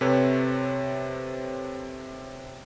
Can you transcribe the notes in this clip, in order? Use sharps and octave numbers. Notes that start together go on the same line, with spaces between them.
C3 C4 A4 B4 C#5